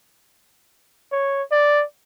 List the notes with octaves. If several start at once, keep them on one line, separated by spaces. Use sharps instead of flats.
C#5
D5